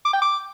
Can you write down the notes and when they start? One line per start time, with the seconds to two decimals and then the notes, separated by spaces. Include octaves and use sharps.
0.05 D6
0.13 G5
0.22 D6